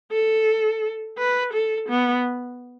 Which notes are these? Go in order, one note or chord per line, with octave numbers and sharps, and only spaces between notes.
A4
B4
A4
B3